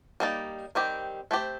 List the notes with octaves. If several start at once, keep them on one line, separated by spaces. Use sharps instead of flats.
G3 A#3 D#4 A#4 D5
D#3 G3 C4 G4
A3 C4 G4 C5